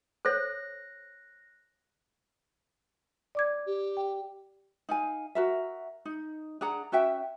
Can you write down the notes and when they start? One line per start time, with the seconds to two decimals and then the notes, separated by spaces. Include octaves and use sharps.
0.25 A4 C5 C#5 F#6 A#6
3.35 D5 D6 G#6
3.67 G4
3.97 G5
4.89 D#4 F5 G#5
5.35 F#4 A#4 E5
6.05 D#4
6.61 D4 G#4 F#5 A#5
6.92 C#4 F#4 E5 G5